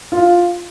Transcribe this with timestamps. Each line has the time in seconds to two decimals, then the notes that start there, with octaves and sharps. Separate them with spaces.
0.12 F4